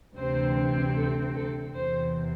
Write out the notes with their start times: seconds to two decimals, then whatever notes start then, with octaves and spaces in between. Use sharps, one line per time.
0.16 D2 C3 E3 C4 C5
0.95 A4
1.35 A4
1.74 E2 C3 E3 C5